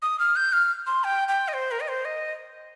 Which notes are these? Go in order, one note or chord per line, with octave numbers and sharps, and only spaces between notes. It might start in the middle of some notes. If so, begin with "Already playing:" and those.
D#6
F6
G6
F6
C6
G5
G5
D#5
C5
A#4
D#5
C5
D#5